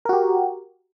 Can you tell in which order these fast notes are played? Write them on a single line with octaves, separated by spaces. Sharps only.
A#4 F#4 G4